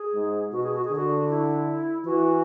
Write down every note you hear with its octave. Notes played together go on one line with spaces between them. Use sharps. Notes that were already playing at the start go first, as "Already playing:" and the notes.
Already playing: G#4
G#2
B2 F#4
G#4
F#4
G#4
D3 F#4
E4
E3 F#4